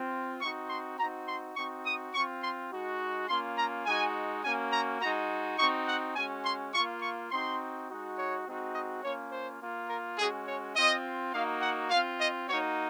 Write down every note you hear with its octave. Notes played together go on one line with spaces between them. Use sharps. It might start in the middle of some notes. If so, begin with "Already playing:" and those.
Already playing: C4 F4
C4 D#4 F#4 C#6
C6
C4 D#4 F#4 A#5
C6
C4 D#4 F#4 C#6
D#6
C4 F4 C#6
C6
G#3 D#4 F#4
A#3 C#4 F4 C6
A#5
G#3 D#4 F#4 G#5
A#3 C#4 F#4 G#5
A#5
G#3 D#4 F#4 A#5
C4 D#4 F#4 C#6
F#5
G#3 C#4 F#4 G#5
C6
A#3 F4 C#6
C#6
C4 D#4 F#4 C6
G#3 D#4 F#4
C#5
G#3 C4 D#4 F#4
D#5
A#3 C#4 F4 C#5
C5
A#3 F4
A#4
G#3 C#4 F#4 G#4
C#5
C4 F4 D#5
A#3 D#4 F#4 F5
F#5
C4 F4 F5
D#5
A#3 D#4 F#4 C#5